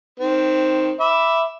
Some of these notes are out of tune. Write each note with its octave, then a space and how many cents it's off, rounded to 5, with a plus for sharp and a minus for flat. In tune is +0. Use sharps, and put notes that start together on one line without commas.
D#3 +0 C4 +0
E5 +0 B5 +0 D6 +0